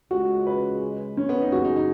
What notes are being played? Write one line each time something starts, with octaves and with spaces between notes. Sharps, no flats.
C#2 C#3 G#3 F#4
B4
C#4
B3
D#4
F#2 C#3 B3 F#4 G#4
D#4
D#4